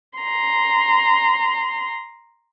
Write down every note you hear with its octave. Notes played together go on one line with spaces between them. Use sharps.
A#5 C6